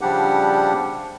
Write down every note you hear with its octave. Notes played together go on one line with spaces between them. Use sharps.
C#3 F3 G3 D4 G4 F#5